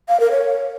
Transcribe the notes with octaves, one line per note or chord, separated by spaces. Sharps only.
F5
A#4
C#5